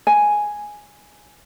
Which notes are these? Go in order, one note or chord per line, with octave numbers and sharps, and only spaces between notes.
G#5